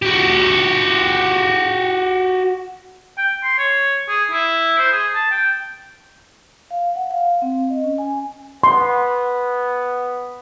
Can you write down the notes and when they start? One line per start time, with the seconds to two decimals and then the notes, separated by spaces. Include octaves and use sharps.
0.02 F#4 G4
3.18 G5
3.44 C6
3.58 C#5
4.09 G#4
4.31 E4
4.78 C5
4.92 G#4
5.15 A5
5.31 G5
6.71 F5
6.96 F#5
7.11 F5
7.42 C4
7.70 D#5
7.84 C#4
7.98 G#5
8.63 B3 C6